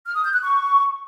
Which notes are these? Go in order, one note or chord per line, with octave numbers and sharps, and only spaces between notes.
F6
D#6
G6
F#6
C#6